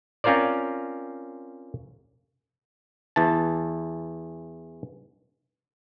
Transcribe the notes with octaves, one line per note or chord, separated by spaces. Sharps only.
C4 C#4 F4 A#4 C5 D5
E2 E3 A5